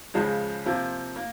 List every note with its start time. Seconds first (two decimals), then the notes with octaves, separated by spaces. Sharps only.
0.14 C#2 C#3 F3 G#3
0.66 C3 F3 A#3
1.16 A#3